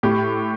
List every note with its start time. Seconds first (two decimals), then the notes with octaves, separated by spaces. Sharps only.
0.03 A2 G4